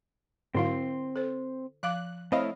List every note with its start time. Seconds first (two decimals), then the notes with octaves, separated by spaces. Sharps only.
0.54 G#2 D3 F#3 C4 E4 F5 C6
1.16 A4 C5
1.83 F3 F5 D6 F#6
2.32 A3 C4 E4 C#5 D#5 F5 B5